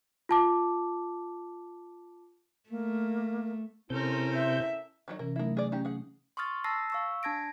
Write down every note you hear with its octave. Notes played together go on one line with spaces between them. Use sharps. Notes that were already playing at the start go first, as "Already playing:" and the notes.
F4 A5 D6
A3 A#3
C3 C#4 E4 A4 A#4 C5 G6
E5
D#3 F#3 D#4
C3 E3 C#4 A#4
F#3 A3 D#4 E4 A#4
G#4 D5
C#4 D#4 G4
G#4 F#5
C6 C#6 D#6 F6 A6
A5 E6 A6 A#6 C7
F5 C#6 E6
D4 A5 G#6 A#6 D7